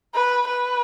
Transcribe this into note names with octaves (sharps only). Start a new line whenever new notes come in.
B4
B4